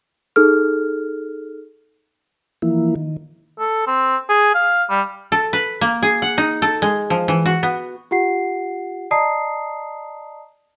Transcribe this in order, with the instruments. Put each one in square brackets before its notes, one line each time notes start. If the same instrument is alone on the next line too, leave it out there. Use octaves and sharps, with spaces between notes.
[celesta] D#4 G#4 A4 F6
[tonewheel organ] E3 F3 A#3 E4
D#3
[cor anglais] A4
C4
G#4
F5
G3
[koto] A4
B4
A#3
G#4
F#5
D#4
A4
G#3
F3
E3
F#4
B3
[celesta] F4 G4 F#5 C7
D5 D#5 A5 A#5 D#6 C7